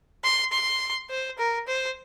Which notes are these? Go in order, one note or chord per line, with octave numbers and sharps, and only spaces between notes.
C6
C6
C5
A#4
C5